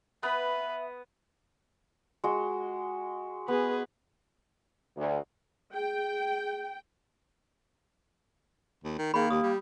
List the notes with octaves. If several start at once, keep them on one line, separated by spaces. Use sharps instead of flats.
B3 B4 E5
G#3 F#4
B3 G#4 B4
D2
G#4 G5
D#2
D#3
D#3 A#3 G#4 B5
D#2 G4 D#6
G3